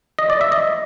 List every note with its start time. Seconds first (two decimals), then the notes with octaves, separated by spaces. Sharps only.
0.19 D#5
0.30 D5
0.41 E5
0.52 D#5